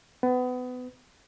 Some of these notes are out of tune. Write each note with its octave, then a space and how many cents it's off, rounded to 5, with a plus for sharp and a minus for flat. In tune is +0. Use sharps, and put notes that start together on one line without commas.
B3 +30